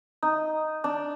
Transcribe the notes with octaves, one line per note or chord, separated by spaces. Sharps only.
D#4
D4